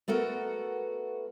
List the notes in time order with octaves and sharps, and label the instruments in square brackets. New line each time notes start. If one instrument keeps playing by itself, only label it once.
[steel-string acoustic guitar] A3 B3 F#4 A4 A#4